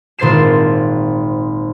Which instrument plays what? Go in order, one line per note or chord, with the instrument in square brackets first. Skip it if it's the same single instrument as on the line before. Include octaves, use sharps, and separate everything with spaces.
[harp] G#1 A#2 C5 A6 C7 E7